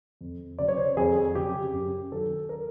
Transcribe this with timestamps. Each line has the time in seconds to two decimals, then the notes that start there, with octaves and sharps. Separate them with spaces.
0.21 F2
0.59 C#3 F#3 D5
0.68 C#5
0.77 C5
0.86 C#5
0.97 F2 G#4
1.35 C#3 F#3 G4
1.73 F#2
2.12 D#3 F#3 A4
2.49 A#4